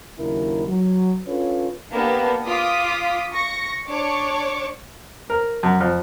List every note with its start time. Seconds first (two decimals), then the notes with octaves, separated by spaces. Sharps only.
0.19 D#2 C#3 F#3 D4 E4 A#4
0.67 F#3
1.27 C#4 D4 F4 A4 B4 C#5
1.91 A#3 B3 D4 G4
2.47 F4 D6 D#6 B6
3.32 C#6 A#6 C#7
3.89 D4 C#5 C#6 D6 C#7
5.30 A#4
5.63 F#2
5.81 F2